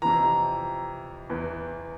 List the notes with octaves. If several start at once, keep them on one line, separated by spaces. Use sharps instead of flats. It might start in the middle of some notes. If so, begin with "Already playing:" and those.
F2 C3 E3 A#5
E2 E3